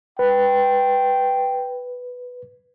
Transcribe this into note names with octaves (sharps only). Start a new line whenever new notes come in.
B4 G5